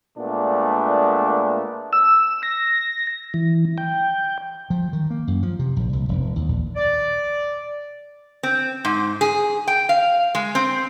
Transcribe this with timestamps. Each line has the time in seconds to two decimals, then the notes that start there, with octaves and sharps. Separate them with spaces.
0.18 A#2 G#3 A3 B3 D4
1.93 E6
2.43 A#6
3.34 E3
3.78 G5
4.70 F3
4.93 D#3
5.10 A#3
5.27 F#2
5.43 F3
5.59 C3
5.76 A#1
5.93 C2
6.09 E1
6.36 D#2
6.49 A#1
6.76 D5
8.43 C4
8.85 G#2
9.21 G#4
9.67 G5
9.89 F5
10.35 G#3
10.55 C4